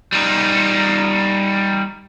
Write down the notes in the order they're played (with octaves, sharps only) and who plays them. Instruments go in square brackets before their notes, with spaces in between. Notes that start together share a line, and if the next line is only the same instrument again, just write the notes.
[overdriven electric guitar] G3 D#4